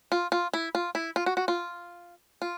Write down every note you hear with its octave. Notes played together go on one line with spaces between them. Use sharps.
F4
F4
E4
F4
E4
F4
F#4
F#4
F4
F4